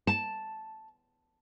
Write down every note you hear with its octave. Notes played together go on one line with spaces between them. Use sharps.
A5